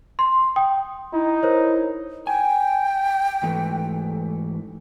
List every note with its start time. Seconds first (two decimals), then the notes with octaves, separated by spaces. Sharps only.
0.19 C6
0.56 G5 D#6
1.13 D#4 E4
1.43 A#4 C5 C#5
2.27 G5 G#5
3.43 G#2 E3 A3